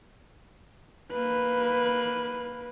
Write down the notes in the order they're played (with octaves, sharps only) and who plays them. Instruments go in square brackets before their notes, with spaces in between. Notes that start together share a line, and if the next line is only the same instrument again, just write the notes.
[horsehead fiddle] A#3 B4